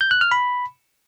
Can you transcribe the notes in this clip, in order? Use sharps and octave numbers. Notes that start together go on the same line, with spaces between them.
G6
F#6
F6
B5